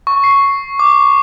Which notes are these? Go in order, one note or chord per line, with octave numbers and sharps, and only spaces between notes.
C#6
C7
D6